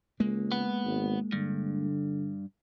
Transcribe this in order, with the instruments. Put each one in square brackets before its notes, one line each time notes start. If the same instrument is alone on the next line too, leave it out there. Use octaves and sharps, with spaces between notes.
[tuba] C#2 [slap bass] G#3 A#3
[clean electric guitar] B3
[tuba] G#1
[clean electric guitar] G2 [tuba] D3